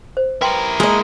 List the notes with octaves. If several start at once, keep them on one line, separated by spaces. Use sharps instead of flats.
C5
E4 A#4 B4 G5 C6
G#3 A#3 D#5